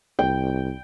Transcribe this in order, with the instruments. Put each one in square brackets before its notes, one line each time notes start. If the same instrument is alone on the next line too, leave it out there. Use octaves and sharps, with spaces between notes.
[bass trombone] C2 [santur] G5